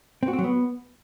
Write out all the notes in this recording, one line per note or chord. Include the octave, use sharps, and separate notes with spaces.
C4
F#4
C4
F#3
B3